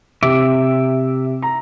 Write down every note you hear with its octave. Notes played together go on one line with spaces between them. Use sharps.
C3 E5 D6
A#5